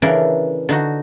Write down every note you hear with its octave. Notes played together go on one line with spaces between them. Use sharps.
C#3 E3 D4 A4 A#4
D3 D#4 F#4